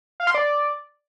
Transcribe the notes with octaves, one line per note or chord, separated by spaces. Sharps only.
F5
C6
D5